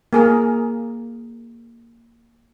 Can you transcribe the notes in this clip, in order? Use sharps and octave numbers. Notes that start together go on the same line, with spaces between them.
A#3 G#4 A#4